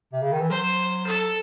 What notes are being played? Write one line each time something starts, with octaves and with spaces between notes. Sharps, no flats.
C3
C#3
D#3
E3
F#3 C5
A4